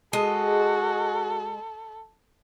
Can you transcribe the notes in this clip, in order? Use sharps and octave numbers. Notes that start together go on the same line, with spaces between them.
G#3 F#4 A4 D#5